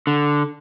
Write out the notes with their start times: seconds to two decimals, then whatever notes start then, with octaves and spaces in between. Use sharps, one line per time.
0.07 D3